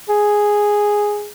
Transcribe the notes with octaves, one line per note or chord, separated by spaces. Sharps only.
G#4